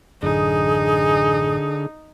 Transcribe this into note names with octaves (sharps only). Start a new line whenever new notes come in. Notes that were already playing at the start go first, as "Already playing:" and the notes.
A1 F#2 D3 D#4 G#4